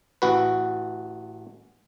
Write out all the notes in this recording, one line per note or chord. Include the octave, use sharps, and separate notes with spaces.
A1 F#4 B4